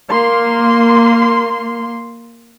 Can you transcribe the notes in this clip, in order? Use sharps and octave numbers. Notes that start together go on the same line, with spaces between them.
A#3 C6